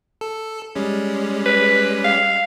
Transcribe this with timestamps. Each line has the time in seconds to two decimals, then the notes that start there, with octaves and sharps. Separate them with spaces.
0.21 A4
0.75 G3 G#3 C#4
1.46 B4
2.04 F5